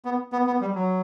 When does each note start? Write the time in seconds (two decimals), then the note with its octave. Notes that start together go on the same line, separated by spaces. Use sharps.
0.05 B3
0.33 B3
0.47 B3
0.61 G3
0.75 F#3